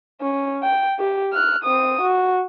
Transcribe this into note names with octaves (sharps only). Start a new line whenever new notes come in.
C#4
G5
G4
F6 F#6
C4 D#6
F#4